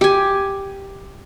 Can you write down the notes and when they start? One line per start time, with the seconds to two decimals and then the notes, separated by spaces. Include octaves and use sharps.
0.01 G4 G#5